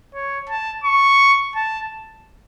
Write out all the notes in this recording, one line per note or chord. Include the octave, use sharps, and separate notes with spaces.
C#5
A5
C#6
A5